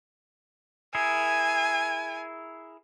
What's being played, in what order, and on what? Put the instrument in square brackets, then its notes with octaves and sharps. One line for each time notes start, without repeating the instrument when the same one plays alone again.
[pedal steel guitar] E4 G#4 A#4 [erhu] G#5